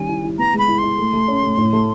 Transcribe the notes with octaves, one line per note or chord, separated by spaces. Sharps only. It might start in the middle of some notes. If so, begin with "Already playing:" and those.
Already playing: D#3 G3 C#4 G#5
E4
E4
B3 A#5
G#3 B5
E4
C6
E4
A3
A3
C#4
A3
A2
A3